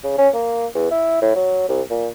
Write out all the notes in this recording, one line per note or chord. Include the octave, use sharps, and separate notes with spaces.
C#3
C#4
A#3
E2
E4
A2
F#3
C2
A#2